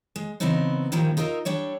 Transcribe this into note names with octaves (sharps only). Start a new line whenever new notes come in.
G#3
C#3 E3 B3 C4 D#4 E5
G2 A#2 D#3 F3 G3 A#3
D#4 F4 A#4 D#5 E5
G3 D4 C#5 E5